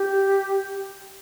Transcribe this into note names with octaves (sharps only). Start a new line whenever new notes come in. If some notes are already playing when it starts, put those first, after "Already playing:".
Already playing: G4